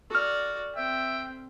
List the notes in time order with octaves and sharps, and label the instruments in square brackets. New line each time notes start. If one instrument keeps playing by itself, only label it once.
[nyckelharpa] F#4 D5 [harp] A4 F6
[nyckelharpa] C4 [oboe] E5 [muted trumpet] G5